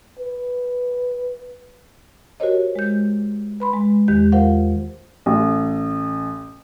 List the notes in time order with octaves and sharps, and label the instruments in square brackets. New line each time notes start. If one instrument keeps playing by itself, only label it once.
[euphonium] B4
[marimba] F#4 G4 A#4 C5 C#5 D#5
G#3 G6
B4 B5 C6
G#3
E2 D#3 G#3 G4 G6
F4 A#4 C5 F5 F#5
[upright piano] A1